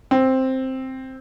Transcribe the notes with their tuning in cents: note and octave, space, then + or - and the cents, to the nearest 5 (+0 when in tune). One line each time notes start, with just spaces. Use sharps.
C4 +5